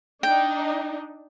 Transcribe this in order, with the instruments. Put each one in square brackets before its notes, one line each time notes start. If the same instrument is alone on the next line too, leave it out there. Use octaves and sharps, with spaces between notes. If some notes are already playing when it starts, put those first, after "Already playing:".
[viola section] D4 D#4 [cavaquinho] G5